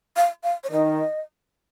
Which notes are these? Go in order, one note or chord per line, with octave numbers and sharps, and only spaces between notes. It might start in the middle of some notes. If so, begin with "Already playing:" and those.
F5
F5
C#5
D#3 D#5